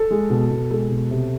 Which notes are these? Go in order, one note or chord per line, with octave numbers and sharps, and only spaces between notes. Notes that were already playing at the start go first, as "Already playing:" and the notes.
Already playing: A4
G#3
B2
B2
G#3 A4
B2
C3